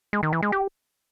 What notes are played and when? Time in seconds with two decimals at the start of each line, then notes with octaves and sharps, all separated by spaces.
0.13 G#3
0.23 D#3
0.33 E3
0.42 G#3
0.52 G4